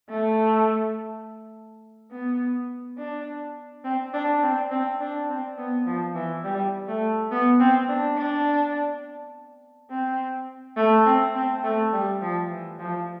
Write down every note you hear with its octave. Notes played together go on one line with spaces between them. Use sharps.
A3
B3
D4
C4
D4
C4
C4
D4
C4
B3
F3
E3
G3
A3
B3
C4
D4
D4
C4
A3
C4
C4
A3
G3
F3
E3
F3